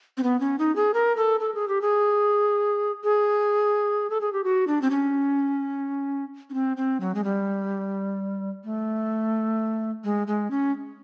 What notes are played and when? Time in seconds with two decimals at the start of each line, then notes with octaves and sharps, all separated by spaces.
0.17 C4
0.23 B3
0.40 C#4
0.59 D#4
0.76 G#4
0.94 A#4
1.17 A4
1.40 A4
1.55 G#4
1.68 G4
1.81 G#4
3.04 G#4
4.10 A4
4.21 G#4
4.33 G4
4.44 F#4
4.67 D4
4.82 C4
4.91 C#4
6.50 C#4
6.54 C4
6.77 C4
7.00 F#3
7.15 G#3
7.24 G3
8.64 A3
10.04 G#3
10.27 G#3
10.51 C#4